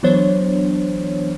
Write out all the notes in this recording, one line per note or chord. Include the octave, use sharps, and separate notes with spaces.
E3 F#3 B3 D4 C5 C#5